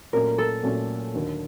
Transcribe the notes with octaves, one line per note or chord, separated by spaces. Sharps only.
A#2 F#3 A3 C#4 A#4
A4
A#2 F#3 A3 C#4
D#2 D3 F#3